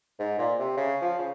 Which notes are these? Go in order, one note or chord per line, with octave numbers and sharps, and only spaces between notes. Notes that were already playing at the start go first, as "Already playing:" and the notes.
G#2
A#2
C3
C#3
F3
C#3